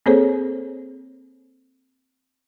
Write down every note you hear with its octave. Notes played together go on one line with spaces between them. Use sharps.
A#3 C4 G#4 A4 C5 C#5